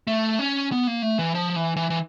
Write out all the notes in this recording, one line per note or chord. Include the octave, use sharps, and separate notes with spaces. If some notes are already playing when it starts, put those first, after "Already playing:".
A3
C#4
B3
A#3
A3
E3
F3
E3
E3
E3